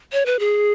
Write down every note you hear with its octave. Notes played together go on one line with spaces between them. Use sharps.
C#5
B4
G#4